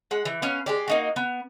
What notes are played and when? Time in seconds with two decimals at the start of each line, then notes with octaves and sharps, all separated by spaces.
0.11 G#3 F#5
0.25 E3
0.42 B3 C#4 F5
0.66 G#3 G4 D5
0.88 A#3 D#4 F#4
1.16 B3